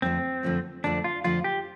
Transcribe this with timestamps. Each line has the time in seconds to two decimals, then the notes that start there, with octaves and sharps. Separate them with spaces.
0.02 F2 D3 F3 A3 C4
0.43 F2 D3 F3 A3
0.84 F2 D3 F3 A3 D4
1.04 F4
1.24 F2 D3 F3 A3 F4
1.44 G4